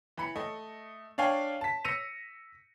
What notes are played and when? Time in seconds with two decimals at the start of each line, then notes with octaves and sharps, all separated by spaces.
0.18 E3 B5 C#7
0.36 A3 D#5
1.18 D4 C#5 F5 G5 G#5
1.61 A5 B6
1.84 E6 A#6 C#7 D#7 F7